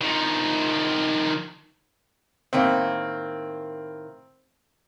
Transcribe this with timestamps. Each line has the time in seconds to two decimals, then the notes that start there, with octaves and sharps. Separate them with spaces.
0.01 D#3 F3
2.53 A2 D#3 A#3 C4